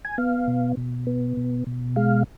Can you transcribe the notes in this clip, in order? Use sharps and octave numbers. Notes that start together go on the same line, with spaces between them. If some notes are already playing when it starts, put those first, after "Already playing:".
G#5
B3 F5
B2
B2
B3
B2
B2
G#3 F5